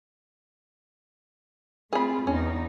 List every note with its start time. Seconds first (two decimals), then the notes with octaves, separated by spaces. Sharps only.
1.93 A3 C4 F4 G#4 B5
2.27 E2 C#4 D#4